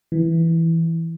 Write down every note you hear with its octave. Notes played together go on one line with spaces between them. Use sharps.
E3